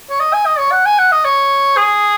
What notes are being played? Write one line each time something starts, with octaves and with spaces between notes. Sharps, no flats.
C#5
D#5
G#5
D#5
C#5
F#5
G#5
F#5
D#5
C#5
G#4